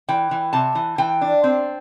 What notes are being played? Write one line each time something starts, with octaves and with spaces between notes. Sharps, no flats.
E3 G5
E3
C3 A5
E3
E3 G5
D4
C4